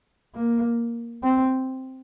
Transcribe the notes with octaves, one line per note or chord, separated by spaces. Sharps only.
A#3
C4